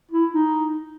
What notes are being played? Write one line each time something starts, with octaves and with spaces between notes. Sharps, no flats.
E4
D#4